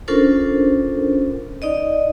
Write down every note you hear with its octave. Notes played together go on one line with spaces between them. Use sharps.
C#4 D4 F4 A4 A#4 C5
D#4 D5 D#5